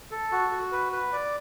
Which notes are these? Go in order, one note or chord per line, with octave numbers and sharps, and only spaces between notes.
A4
F#4
F#4
B4
B4
D5